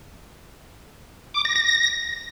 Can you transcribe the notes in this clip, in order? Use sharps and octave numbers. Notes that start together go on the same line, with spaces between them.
D6
A#6
A#6